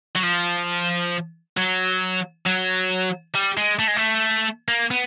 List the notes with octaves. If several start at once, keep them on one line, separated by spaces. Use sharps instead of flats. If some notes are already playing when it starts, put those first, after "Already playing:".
F#3
F3
F#3
F#3
G3
G#3
A3
G#3
A3
A#3
B3